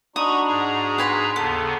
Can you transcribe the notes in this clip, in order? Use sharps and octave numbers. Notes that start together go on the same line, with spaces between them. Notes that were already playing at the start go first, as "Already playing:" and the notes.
D4 D#4 F#4 A#5 B5 C#6 D#6
G#2 G#4 A#5
B4 G#5 C6
D#2 C#3 B3 A4